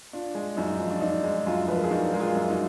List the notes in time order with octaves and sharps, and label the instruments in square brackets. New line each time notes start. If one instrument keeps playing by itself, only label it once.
[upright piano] D4 F4
G#3
F#2 D#4
F3
D4
D4 D#4
G#3
F#2 D4 F4
F3 B4
A#4
G#4
D4 D#4 F#4
G#3 A#4
F4 G#4
F#2
D#4 F#4